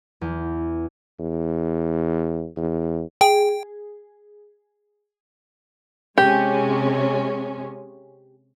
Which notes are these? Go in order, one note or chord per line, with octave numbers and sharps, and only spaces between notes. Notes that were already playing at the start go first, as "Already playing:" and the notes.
E2
E2
E2
G#4 G5
C3 G#3 C#4 G4